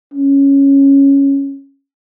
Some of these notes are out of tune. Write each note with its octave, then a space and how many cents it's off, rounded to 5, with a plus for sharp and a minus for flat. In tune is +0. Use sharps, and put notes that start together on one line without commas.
C#4 -5